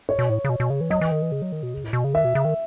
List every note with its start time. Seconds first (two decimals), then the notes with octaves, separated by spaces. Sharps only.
0.09 C#5
0.19 B2
0.29 A2
0.44 C#3
0.49 B2
0.60 B2
0.70 C#3
0.81 E3
0.90 F#3 D#5
1.01 E3
1.12 D#3
1.22 E3
1.32 C#3
1.42 F#3
1.52 D#3
1.63 B2
1.74 C#3
1.84 A2
1.93 B2
2.04 C#3
2.14 D#3 E5
2.24 B2
2.35 C#3
2.45 D#3